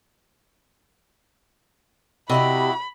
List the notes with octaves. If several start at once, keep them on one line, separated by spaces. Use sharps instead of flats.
C3 E4 F#4 G4 D5 D#5 B5